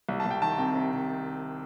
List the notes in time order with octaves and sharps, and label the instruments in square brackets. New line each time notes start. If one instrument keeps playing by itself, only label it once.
[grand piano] C2
A5
C2
G5
D#3 A5
C3 G5
C3
C3